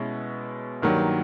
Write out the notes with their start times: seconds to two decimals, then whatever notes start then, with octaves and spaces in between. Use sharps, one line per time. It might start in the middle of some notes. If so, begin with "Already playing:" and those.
Already playing: B2 G#3 C#4 E4
0.82 G2 D#3 F#3 A#3